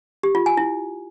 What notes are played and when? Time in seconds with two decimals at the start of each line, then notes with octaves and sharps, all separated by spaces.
0.23 G4
0.35 F4
0.46 G#5
0.57 E4